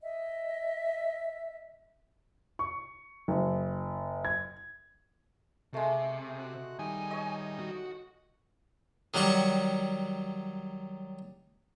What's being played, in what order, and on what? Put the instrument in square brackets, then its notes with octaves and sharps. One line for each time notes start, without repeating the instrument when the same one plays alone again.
[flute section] D#5 E5
[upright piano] C#6
F#1
G#6
[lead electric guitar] C3 [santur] G#3 A3
[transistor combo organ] F#4
[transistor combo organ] D#3 G3 D#4 [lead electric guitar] G#5
[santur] C#5 D#5
[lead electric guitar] F#4
[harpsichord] D#3 F#3 G3 F#4 C#6